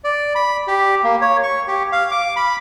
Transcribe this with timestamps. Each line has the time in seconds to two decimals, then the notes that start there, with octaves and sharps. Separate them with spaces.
0.04 D5
0.35 B5
0.68 G4
1.04 A#3
1.21 C#5
1.43 C#6
1.67 G4
1.92 F5
2.11 D6
2.37 B5